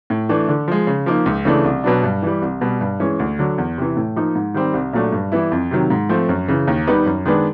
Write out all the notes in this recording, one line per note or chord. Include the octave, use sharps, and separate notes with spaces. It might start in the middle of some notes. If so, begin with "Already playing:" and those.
A2
E3 A3 D4
D3
F3 G#3
C#3
F3 A#3 D#4
C#2
C#3 E3 A3 D4
C2
B2 F#3 B3 D4
G2
E3 G3
C2
B2 G3 B3
G2
E3 G#3 C#4
D2
D3 F#3
E2
C3 E3
A2
F3 A#3 D#4
G#2
D#3 G3 C4
C2
A#2 F#3 A3 D4
G2
E3 G3 B3 E4
F2
C3 D#3 F#3
G#2
F3 A3 C4
F#2
C#3 E3
D#2
D#3 G3 B3 D#4
F#2
D#3 G#3 B3 D4